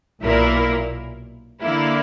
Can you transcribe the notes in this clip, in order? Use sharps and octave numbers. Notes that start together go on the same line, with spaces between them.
B1 A#2 A#3 E4 A#4
D3 A#3 E4